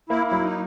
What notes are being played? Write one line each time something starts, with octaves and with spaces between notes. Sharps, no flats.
A#3 E4
F#3 E4
D#4